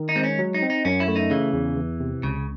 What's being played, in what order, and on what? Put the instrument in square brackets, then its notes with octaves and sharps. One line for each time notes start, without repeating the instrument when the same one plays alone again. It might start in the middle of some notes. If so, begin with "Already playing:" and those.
Already playing: [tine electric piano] D#3
[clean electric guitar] D#4
[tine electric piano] G#3 [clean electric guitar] C4
[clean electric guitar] C#4
[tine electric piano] F#3
[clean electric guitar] D#4
[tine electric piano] C4
[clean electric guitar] D#4
[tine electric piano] F#2 [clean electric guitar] C#4
[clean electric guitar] E4
[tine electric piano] A3
[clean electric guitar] D#4
[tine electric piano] C#3 [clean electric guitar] E3
[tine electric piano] E2
E2
C3
[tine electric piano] C#2 [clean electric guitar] C#3